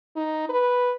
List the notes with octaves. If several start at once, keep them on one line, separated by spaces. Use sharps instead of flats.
D#4
B4